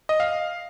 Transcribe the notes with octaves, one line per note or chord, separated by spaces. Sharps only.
D#5
F5